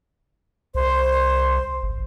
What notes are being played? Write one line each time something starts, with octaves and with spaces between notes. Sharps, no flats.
C2 C5
G#1